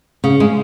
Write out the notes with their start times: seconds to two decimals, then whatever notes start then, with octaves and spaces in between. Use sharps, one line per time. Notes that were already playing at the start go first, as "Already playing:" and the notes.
0.24 C#3
0.40 G#3